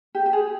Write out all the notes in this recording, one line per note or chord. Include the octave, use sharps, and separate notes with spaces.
G4
G4
G#4